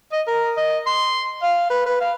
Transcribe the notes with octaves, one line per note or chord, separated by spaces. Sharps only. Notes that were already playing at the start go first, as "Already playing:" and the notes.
D#5
A#4
D#5
C6
F5
B4
B4
F5